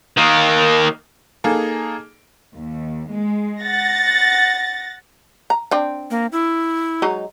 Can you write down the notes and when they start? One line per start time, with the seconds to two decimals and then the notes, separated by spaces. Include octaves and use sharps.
0.17 D#3 A#3
1.44 A#3 D#4 G#4 A4
2.54 D#2
3.12 G#3
3.61 F#5 A6 A#6
5.50 A#5
5.71 C4 D4
6.11 A#3
6.32 E4
7.02 F#3 G#3 D#4